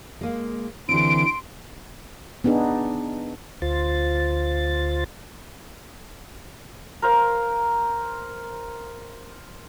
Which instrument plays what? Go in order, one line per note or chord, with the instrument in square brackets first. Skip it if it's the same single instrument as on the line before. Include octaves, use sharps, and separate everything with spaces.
[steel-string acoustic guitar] G#3 A#3
[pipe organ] D3 E3 [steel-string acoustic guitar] C4 D4 G4 [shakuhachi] C6 [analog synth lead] D7
[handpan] B3 D4 D#4 G#4
[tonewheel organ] D2 F4 C5 A6
[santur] A#4 C5 F5